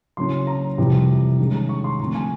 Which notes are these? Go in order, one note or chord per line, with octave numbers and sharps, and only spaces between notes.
C#3 F#3 A#3 C#4 E4 C6
A#5
F2 C3 E3 G3
D#3 G#3 C#4
A#5
C#6
C6
D3 F3 A3 C4 A#5
G#5